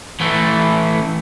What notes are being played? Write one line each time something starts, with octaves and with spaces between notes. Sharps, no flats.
E3 A3